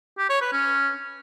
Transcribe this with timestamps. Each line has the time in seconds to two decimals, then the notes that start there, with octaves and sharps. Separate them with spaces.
0.18 G4
0.30 C#5
0.41 B4
0.52 C#4